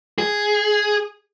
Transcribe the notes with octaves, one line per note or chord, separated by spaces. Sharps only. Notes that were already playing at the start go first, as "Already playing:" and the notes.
G#4